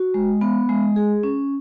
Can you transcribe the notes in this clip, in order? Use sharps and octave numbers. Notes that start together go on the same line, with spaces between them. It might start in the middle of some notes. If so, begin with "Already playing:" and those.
Already playing: F#4
G#3
B3
G#3
G#4
C#4